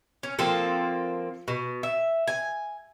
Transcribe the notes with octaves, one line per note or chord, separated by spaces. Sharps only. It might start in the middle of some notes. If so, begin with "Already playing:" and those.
C#4
F3 A#3 C4 A4
B2
E5
G#5